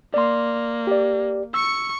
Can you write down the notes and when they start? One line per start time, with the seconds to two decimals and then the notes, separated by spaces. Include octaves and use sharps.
0.14 A#3 D5 C6
0.87 G4 D5
1.54 C#6 E6 C#7